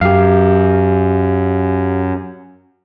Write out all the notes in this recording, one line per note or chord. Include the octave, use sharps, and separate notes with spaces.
F#2 G4 F5